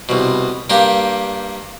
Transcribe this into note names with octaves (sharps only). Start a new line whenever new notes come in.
C2 B2
G2 A#3 G4